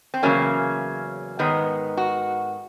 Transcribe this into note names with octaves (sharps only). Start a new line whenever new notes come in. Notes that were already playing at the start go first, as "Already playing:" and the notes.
C4
E2 C#3 F#3 A#3 C#4
G#2 D#3 G#3 B3
F#4